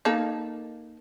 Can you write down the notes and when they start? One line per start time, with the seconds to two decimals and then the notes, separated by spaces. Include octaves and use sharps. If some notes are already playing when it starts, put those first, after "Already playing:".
0.05 A#3 D#4 A4